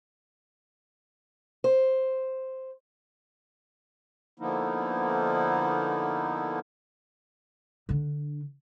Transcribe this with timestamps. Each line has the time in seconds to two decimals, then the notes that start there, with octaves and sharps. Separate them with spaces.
1.64 C5
4.39 D3 F3 A#3 B3 D#4 E4
7.89 D3 D4